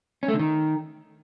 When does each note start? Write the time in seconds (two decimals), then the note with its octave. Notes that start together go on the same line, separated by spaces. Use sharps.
0.23 C#4
0.28 A3
0.34 D3
0.39 D#3